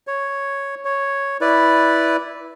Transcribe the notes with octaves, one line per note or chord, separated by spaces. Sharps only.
C#5
C#5
E4 B4 D5